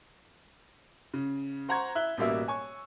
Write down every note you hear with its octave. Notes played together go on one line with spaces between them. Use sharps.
C#3
C5 F#5 A#5 C6 C#6 G#6
E4 E5 F#6 G7
A1 B2 G3 A#3 E5 E6
C#5 G#5 C#6